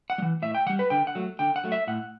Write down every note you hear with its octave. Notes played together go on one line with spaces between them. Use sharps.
F#5
G3
E3
A2 E5
G5
E3 G3 F#5
B4
D3 G5
F#5
F#3 A3
D3 G5
F#5
F#3 A3
E5
A2 F#5